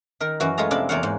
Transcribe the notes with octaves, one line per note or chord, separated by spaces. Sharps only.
D#3 A#4
F#2 E3 F#4
G#3 A3 F4 G#4 A#5
F2 C3 D4 E4 D5
E2 A#3 C5 C#5 F5 F#5
G#2